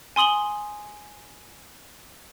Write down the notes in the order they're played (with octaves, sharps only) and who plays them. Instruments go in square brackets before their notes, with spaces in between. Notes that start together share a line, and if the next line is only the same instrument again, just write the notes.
[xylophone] G#5 C6 D#6 F#7 G7